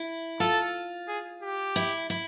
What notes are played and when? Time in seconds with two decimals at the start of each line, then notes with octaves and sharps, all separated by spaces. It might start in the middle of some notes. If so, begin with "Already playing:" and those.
Already playing: E4
0.40 F4 A4
1.08 G#4
1.43 G4
1.76 E4
2.10 E4